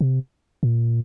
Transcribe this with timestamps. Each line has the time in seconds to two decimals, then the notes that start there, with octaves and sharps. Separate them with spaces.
0.01 C3
0.63 A#2